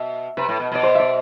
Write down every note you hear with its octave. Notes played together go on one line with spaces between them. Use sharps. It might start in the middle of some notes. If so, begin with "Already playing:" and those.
Already playing: B2 E5
C3 B4
A2
B2
B2 D5
C5
D5 E5